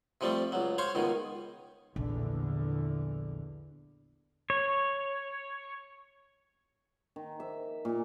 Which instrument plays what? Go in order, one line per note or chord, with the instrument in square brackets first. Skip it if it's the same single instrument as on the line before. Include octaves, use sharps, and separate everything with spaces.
[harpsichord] C3 F3 G3 A3 C4
C#2 F#3
C5 C#5 F5 C6 C#6
C#2 B2 D#3
[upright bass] A#1 [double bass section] E2 D3
[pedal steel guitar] C#5
[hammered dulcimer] D#3
E5
A#2